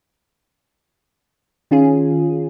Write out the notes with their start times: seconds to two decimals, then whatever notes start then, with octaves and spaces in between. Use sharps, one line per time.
1.71 D#3 C#4 F4 G#4